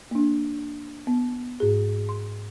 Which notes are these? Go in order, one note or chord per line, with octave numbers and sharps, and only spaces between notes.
A#3 D4
B3
G#2 G#4
C6